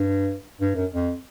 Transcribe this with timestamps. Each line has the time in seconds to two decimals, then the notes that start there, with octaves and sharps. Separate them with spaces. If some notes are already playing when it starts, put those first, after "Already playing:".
Already playing: G2
0.61 G2
0.75 F#2
0.91 F2